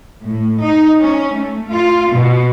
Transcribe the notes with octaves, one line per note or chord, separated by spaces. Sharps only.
A2
D#4
C#4
A3
F4
B2